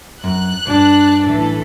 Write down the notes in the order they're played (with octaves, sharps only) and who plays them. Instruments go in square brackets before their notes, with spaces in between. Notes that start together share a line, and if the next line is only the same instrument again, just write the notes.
[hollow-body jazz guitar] F#2 [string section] F#6
[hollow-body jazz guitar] B1 G2 [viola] D4
[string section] A1 E3 A4